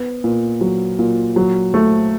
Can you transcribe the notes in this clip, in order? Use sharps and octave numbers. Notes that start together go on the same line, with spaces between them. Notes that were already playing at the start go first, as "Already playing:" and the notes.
Already playing: B3
A#2
F#3
A#2
F#3
A3